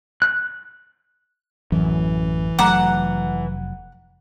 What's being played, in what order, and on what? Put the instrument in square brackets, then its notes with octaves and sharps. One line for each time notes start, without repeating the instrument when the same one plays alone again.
[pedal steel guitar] F#6
[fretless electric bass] A1 F#2 [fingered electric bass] E3
[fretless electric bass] F1 F#3 A3 [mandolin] F#5 [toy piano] A#5 D6